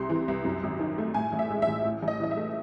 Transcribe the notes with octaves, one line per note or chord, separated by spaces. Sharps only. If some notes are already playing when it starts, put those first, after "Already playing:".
Already playing: C2 C3 C6
E3
C2
F#2
G#1
D#3
A3
A2 G#5
A1
E5
G#3
E5
A1
A2
A1
D#5
E3 D#5
E5
A3